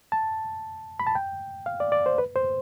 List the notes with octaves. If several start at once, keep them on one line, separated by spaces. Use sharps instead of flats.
A5
B5
A5
G5
F5
D5
D5
C5
B4
C5